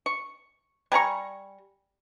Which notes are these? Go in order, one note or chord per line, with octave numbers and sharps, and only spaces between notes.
C#6
G3 G#5 A#5 C#6